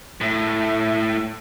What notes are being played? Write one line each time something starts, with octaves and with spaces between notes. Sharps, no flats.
A2